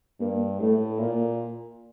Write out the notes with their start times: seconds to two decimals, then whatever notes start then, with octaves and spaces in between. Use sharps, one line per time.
0.20 G2 A#3
0.60 A2 A3
0.99 A#2 A#3